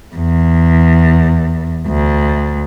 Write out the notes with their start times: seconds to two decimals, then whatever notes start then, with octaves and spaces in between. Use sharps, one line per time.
0.16 E2
1.87 D2